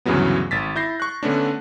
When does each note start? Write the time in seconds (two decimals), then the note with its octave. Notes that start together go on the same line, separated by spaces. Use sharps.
0.05 D2 G2 C#3 E3 F#3 B3
0.51 G#1 A6 B6
0.76 E4 G6 A#6 C7
1.00 C#6 F#6
1.23 D3 A3 B3 C#4 D4